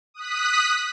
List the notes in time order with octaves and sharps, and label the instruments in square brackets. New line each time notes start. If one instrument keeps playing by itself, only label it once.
[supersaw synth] D#6 F#6 B6